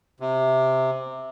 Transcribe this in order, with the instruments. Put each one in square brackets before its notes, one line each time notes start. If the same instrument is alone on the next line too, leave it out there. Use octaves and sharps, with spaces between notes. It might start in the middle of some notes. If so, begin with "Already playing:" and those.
[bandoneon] C3